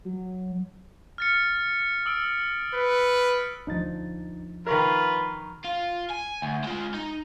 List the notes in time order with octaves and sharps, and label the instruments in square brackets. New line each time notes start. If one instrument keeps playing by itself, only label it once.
[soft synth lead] F#3
[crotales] F6 A6 C#7
D#6 E6 D7
[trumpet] B4
[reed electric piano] D2 D#4 A6 [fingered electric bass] F3 D4
[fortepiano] D#3 A#4 [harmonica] F4 B4 [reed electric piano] A#5 C#6 F6
[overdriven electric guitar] F4
G#5
D2
G#3 F4
D#4